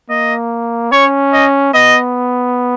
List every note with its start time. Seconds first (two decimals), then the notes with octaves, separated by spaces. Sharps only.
0.09 A#3 D#5
0.92 C#4 C#5
1.33 D#5
1.74 B3 D#5